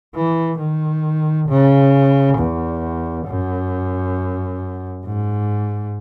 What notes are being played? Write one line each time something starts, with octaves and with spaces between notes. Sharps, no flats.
E3
D#3
C#3
E2
F#2
G#2